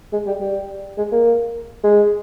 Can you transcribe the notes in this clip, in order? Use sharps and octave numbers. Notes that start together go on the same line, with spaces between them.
G#3
G3
G3
G#3
A#3
G#3